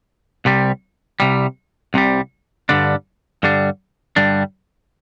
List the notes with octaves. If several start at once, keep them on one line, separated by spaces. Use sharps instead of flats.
C2 C3 G3
C2 C3 G3
C2 C3 G3
G2 D3 G3 D4
G2 D3 G3 D4
G2 D3 G3 D4